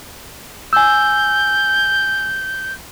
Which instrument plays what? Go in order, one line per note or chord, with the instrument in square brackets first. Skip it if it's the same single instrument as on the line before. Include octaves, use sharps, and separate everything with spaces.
[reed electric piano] G#5 E6 [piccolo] G6